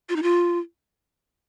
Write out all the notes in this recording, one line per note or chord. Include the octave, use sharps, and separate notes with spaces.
F4
D#4
F4